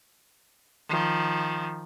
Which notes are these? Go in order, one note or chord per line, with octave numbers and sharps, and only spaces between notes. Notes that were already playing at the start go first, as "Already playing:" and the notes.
D#3 F3